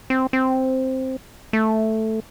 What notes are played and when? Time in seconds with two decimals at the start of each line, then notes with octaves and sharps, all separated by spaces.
0.10 C4
0.33 C4
1.53 A3